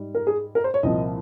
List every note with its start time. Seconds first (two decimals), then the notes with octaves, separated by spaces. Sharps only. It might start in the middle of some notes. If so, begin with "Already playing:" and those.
Already playing: G#2 G3
0.15 A#4
0.27 G#4
0.55 A#4
0.64 C5
0.74 C#5
0.83 C2 A#2 F3 C4 D#5